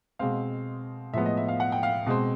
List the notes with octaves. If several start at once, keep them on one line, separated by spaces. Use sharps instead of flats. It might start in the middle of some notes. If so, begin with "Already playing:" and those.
B2 G#3 C4 F5
A2 F3 G#3 B3 E5
D#5
E5
F5
F#5
G5
F5
B2 G#3 C4